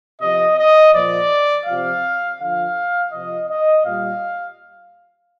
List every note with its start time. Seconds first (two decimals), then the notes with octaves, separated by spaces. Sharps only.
0.21 C3 F3 D#5
0.58 D#5
0.93 A#2 F3 D5
1.67 C3 F3 F5
2.40 D3 F3 F5
3.12 C3 F3 D#5
3.49 D#5
3.85 A#2 G3 F5